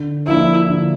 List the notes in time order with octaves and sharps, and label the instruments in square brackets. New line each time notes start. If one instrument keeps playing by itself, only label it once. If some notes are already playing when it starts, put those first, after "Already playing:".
Already playing: [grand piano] D3
[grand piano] F3 A#3 D4 [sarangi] E4
[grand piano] D3